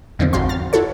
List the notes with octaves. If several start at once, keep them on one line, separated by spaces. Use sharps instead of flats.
E2 D3 D#3 F3 C4
G#1 F2 F#4 C5 F5 C6
F6 A6
E4 F#4 A4 C#5